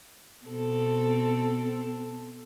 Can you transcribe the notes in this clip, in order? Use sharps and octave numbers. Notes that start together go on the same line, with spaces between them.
B2 C4 A4